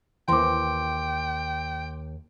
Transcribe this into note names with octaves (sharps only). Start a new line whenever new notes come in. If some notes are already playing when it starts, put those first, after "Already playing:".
D#2 E3 C5 G5 C6 D6